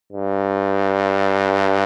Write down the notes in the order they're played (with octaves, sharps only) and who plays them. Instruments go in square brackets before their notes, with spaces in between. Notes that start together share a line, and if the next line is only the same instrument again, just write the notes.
[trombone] G2